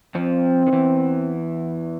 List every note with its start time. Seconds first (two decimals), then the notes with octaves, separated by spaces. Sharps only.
0.15 F2 F3 C4
0.67 D#3
0.73 E2 E3